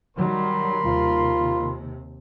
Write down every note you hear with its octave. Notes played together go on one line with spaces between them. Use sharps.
D#3 F#3 G3 A#4 B5 C6
D#2 C3 F4